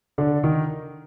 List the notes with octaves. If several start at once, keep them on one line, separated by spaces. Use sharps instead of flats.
D3 D4
D#3 D#4